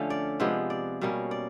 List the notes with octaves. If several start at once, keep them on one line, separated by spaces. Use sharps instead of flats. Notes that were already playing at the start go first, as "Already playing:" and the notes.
Already playing: D3 F3 A3 C#4 F5
D5
C3 F3 G#3 B3
D5
B2 G3 A#3 C#4
D5